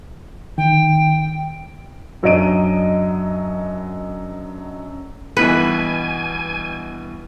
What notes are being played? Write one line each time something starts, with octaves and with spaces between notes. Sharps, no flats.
D#3 G5
F#2 F#3 D4 D#5 D7 D#7
G2 B2 E3 B4 G#5